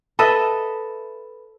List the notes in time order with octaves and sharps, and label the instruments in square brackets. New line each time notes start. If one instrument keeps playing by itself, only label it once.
[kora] A4 B4 D#5 E5